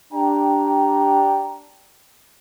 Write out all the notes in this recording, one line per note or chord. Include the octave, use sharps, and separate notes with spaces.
D4 G4 G5 A#5